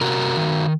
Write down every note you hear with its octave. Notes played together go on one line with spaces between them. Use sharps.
C3 F#4 A#4
D#3